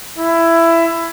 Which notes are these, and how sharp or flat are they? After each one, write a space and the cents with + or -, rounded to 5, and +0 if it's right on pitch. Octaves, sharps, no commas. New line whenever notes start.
E4 +15